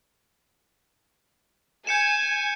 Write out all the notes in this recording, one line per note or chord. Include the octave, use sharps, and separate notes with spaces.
G#5 G6 C#7 E7